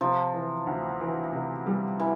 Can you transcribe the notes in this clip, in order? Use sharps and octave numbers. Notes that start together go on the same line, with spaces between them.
C3 F3
E3
D2
E3
C3
G3
E3